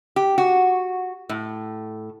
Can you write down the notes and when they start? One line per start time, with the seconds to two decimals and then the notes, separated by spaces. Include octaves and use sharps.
0.16 G4
0.38 F#4
1.29 A2